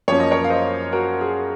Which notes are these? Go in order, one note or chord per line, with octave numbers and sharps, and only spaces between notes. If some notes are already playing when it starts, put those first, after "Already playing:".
F#2 F3 A#3 C#4 C#5
D#5
A#4 C#5
F5
C5 D#5
F#4 A#4
G#4